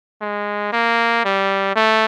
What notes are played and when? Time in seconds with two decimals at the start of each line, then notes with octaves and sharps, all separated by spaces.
0.21 G#3
0.72 A#3
1.25 G3
1.76 A3